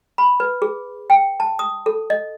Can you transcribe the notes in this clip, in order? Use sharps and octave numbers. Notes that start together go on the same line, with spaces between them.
B5
B4
G#4
G5
A5
D#6
A4
D#5